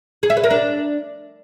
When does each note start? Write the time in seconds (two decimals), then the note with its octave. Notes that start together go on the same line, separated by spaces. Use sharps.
0.23 G#4
0.30 E5
0.37 B4
0.44 A#4
0.50 D4